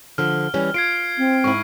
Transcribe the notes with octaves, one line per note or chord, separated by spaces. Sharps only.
D3 F3 F6
E3 G3 C#4
F4 G#6 C7 D7
C4
G#2 E4 C#6